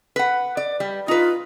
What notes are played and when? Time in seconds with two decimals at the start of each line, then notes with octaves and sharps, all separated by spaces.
0.16 B4 F#5
0.57 D5
0.80 G3
1.08 D#4 F4 B4